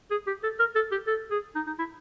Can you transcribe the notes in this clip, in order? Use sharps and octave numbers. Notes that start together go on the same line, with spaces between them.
G#4
G4
A4
A#4
A4
G4
A4
G#4
D#4
D#4
E4